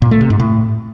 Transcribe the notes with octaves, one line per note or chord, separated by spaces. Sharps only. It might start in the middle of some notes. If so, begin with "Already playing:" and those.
A#2
A3
C3
G#2
A2